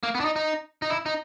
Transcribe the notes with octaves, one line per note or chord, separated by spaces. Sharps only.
A#3
B3
D4
D#4
D#4
D#4
E4
D#4